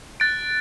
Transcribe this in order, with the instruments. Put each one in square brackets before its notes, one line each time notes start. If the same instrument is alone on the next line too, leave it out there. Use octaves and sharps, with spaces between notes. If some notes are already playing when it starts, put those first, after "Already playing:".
[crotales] F#6 A6 D7